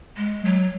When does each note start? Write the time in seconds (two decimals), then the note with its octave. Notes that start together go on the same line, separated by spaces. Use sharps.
0.17 G#3
0.45 F#3